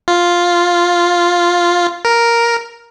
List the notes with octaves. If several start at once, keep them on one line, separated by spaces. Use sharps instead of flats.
F4
A#4